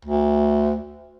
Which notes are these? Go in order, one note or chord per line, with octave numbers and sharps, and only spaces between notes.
D2